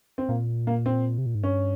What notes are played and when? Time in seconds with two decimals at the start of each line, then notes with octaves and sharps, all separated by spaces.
0.18 C4
0.29 A#2 A#3
0.67 A#3
0.86 C4
1.18 C3
1.26 A#2
1.35 G#2
1.43 G2 C#4